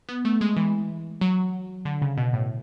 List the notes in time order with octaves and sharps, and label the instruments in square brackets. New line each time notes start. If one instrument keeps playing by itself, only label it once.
[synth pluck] B3
A3
G#3
E3
F#3
D3
C#3
B2
A2